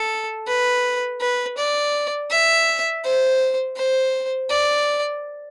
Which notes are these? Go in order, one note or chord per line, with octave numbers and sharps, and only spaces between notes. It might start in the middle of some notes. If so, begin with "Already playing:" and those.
Already playing: A4
B4
B4
D5
E5
C5
C5
D5